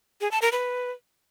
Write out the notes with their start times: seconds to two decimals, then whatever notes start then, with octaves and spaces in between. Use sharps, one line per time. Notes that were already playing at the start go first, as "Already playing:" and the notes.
0.21 G#4
0.31 A5
0.42 A#4
0.52 B4